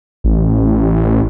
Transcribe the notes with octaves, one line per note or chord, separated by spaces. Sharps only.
A1